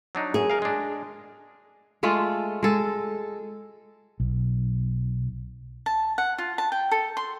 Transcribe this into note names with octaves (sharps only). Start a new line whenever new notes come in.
F#3 D4 D#4
F#2 G#4
A#4 F5
G#3 D4
G#3 A3 F4 A4
G#3 A4
B1
A5
F#5
F4
A5
G5
A4
C6